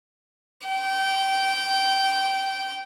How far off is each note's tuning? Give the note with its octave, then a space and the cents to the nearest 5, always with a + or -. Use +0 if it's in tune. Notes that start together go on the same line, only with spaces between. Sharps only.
G5 -20